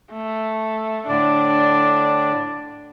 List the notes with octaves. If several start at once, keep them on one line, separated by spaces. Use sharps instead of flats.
A3
A2 D3 D4 D5